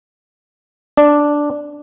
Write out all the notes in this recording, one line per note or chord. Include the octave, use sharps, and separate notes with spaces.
D4